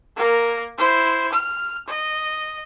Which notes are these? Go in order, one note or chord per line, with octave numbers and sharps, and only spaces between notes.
A#3 A#4
E4 C5
F6
D#5